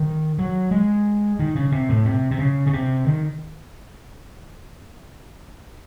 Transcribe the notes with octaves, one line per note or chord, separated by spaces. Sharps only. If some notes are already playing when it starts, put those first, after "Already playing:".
Already playing: D#3
F#3
G#3
D#3
C#3
C3
A2
C3
C3
C#3
C#3
C3
D#3